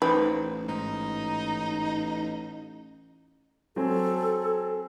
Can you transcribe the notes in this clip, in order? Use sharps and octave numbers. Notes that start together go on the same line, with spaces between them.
A1 D#4 B4 C5 G5
G#2 D#4
F#3 C4 A4 G#5